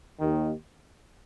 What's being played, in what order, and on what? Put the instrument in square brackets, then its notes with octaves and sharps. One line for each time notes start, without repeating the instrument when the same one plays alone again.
[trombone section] D#2 D#3